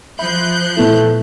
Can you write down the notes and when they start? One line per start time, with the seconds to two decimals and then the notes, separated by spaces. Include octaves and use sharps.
0.19 F3 E5 B5 F#6 G6
0.77 A#2 A3 B3 E4